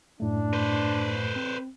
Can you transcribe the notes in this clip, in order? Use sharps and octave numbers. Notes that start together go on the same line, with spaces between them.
F#2 A2 A3 D4
B4 C5
C4